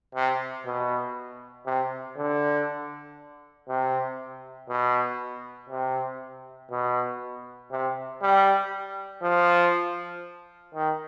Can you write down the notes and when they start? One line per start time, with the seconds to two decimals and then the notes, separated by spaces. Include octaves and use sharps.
0.15 C3
0.66 B2
1.66 C3
2.17 D3
3.68 C3
4.69 B2
5.70 C3
6.71 B2
7.71 C3
8.22 G3
9.23 F3
10.75 D#3